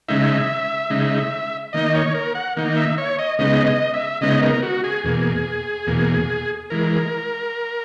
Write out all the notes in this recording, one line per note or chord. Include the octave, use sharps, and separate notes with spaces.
C#3 G#3 D#4 E5
C#3 G#3 D#4
D#3 A#3 D#4 D#5
C#5
A#4
F#5
D#3 A#3 D#4
E5
C#5
D#5
C#3 G#3 B3 D#4 D#5
D#5
E5
C#3 G#3 B3 D#4 D#5
A#4
F#4
G#4
E2 B2 A#3
E2 B2 A#3
E3 G#3 A#4